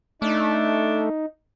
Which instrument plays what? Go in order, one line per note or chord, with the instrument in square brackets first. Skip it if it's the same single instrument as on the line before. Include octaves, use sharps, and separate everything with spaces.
[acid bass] A3 [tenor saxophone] D4 [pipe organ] D#4